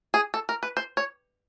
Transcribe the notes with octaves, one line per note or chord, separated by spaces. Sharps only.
G#4
A4
A#4
B4
C5
C#5